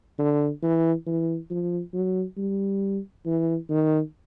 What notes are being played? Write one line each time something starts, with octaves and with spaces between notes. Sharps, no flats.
D3
E3
E3
F3
F#3
G3
E3
D#3